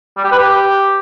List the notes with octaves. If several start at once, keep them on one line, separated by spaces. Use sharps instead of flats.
G3
G4
B4
G4